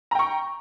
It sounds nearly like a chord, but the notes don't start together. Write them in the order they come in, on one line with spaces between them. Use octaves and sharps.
A#5 G5 C#6